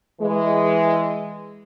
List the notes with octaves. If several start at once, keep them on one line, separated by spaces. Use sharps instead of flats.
E3 G#3